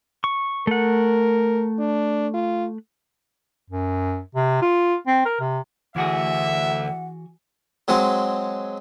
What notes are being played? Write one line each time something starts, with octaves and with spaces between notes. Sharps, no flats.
C#6
A3 A#4 F#5
D4
F4
F#2
C3
F4
C4
A#4
C3
D2 E3 F#4 G#4 E5 F#5
F#3 G#3 C4 F#4